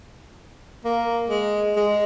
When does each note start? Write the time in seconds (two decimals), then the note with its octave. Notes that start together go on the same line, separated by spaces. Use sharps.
0.85 A#3
1.30 G#3
1.76 G#3